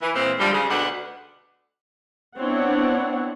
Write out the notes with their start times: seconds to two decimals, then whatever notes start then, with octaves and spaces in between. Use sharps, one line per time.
0.02 E3
0.15 A#2 E3 G#3 C4 C5
0.40 D3 F3 G3
0.53 C#3 G3 G#3 G#4
0.69 D2 B2 D4 B4 F#5
2.38 B3 C4 D4 E4 C#5 F#5